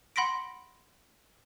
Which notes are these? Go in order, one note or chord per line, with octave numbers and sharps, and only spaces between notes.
F#5 B5 C6 A#6 B6 D7